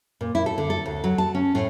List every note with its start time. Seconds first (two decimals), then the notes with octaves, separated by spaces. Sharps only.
0.21 A#2
0.35 E4
0.46 A4
0.58 D3
0.70 A4
0.86 D2
1.04 F#3
1.18 A5
1.35 C#4
1.55 A2